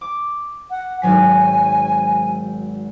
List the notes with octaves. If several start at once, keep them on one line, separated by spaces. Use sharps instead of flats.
D6
F#5
G#1 F#3 G#5 B6